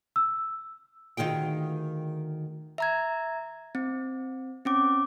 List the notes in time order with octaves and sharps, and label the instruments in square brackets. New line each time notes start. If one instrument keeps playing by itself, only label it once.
[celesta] E6
[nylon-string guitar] D2 D#3 F4 G#4 G5
[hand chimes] E5 A#5 G#6
C4
C4 C#4 D6